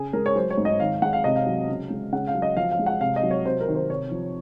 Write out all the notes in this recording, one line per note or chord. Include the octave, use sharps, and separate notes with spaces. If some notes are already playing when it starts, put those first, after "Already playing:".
Already playing: C#3 G#4
G#3 A#4
C#5
F#3 C5
C#5
G#2
D#5
D#3 F5
G#3 F#5
F5
C3 D#5
F5
F#3
C#3
G#3
C#3 F#5
F5
F#3
D#5
F3 F5
F5
G#3
F#5
C3 F5
D#5
F#3
C#5
C3 C5
A#4
D#3
C5
C3 C#5
F3